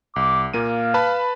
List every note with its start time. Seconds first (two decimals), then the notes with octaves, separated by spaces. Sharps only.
0.16 C2 D6
0.54 A#2 A#3 F5 D#7
0.94 B4 A5 B5